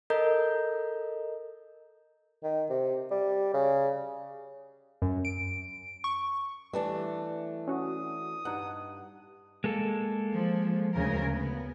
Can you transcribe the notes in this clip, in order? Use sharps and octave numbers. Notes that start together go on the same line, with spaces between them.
A4 A#4 D#5 A#5 G6
D#3
C3
G3
C#3
F#2
D7
C#6
E3 G3 A3 D4
C#4 F#4 D#6
G2 D#4 F#5
G#3 A#3 A4
F3
D2 C#3 A#4
B3